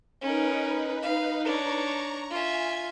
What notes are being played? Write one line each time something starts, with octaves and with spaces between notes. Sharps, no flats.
C#4 D#4 A#4 B4
F5
D4 C#5 A#5 C#6
F4 E5 G#5 G#6